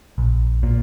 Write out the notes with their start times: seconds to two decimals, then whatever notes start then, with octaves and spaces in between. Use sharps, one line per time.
0.18 A#1
0.63 A#2